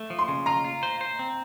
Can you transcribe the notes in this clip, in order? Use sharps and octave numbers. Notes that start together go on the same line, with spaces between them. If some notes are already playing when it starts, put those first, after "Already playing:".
Already playing: A3
F3
C6
C#3
F4 A#5
F4
C5
C5
C4